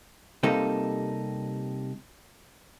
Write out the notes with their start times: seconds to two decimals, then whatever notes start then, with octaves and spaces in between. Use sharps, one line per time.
0.43 C3 G3 A#3 D#4 A4